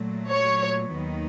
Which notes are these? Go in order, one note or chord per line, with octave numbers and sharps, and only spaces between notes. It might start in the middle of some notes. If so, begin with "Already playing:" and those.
Already playing: A#2 F#3 A3
C#5
D#2 D#3 F#3 B3 D#4